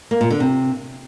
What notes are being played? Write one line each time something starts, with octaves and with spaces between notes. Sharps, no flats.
A#3
A#2
D3
C3